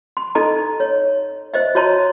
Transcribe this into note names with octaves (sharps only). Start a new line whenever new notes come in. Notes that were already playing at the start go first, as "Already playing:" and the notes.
C6
D#4 A4 D#5 A5 A#5
C#5
C5 D#5 E5
F#4 C#5 D#5 A5 A#5 C6